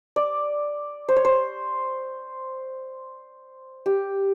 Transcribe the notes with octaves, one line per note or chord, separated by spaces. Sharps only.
D5
C5
C#5
C5
G4